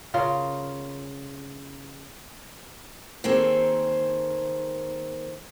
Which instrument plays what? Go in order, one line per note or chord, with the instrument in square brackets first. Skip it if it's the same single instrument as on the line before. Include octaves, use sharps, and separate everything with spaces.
[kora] C#3 F4 A#4 F5
[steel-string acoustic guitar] D#3 A#3 C4 G#4 A4